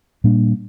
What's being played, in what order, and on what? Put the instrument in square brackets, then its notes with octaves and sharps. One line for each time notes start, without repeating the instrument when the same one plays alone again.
[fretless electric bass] A#2 G3 A#3 D4